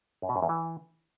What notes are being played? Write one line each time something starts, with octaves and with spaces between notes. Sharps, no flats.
F#2
B2
F#2
E2
E3